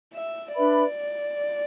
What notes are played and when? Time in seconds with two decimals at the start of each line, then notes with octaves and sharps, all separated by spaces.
0.14 E5
0.55 D4 B4 D5 E5 B5